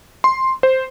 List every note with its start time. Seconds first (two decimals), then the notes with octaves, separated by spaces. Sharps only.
0.24 C6
0.63 C5